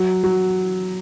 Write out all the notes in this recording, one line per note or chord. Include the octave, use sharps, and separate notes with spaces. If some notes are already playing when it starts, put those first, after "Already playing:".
Already playing: F#3
F#3